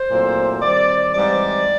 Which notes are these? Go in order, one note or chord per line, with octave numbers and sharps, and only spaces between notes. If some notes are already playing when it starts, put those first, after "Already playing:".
Already playing: C5
A#2 F#3 A3 C4 E4
D#3 G3 C4 D5
G#2 E3 G3 C4 D5